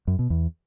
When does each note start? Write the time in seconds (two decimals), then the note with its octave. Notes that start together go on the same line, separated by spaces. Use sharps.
0.07 F#2
0.19 B2
0.30 E2